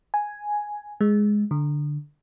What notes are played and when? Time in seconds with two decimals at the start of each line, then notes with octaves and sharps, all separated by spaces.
0.14 G#5
1.01 G#3
1.51 D3